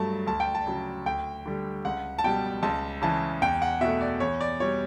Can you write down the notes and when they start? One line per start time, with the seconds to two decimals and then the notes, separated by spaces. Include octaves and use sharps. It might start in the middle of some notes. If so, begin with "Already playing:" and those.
Already playing: G2 F#3 A3 A5
0.26 D2 A5
0.40 G5
0.55 A5
0.66 C#3 F#3
1.06 D2 G5
1.46 D3 G3
1.85 C#2 F#5
2.18 A5
2.24 B2 G3 G5
2.63 C#2 A5
3.02 C#3 E3 A5
3.42 E2 G5
3.62 F#5
3.81 B2 A3 E5
4.01 D5
4.20 E2 C#5
4.41 D5
4.60 B2 G3 C#5